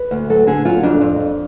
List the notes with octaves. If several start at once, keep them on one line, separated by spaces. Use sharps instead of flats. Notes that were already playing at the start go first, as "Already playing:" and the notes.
Already playing: B4
D2
F#3 A4
D3 G#4
F#3 F4
F2 D4
F2
F2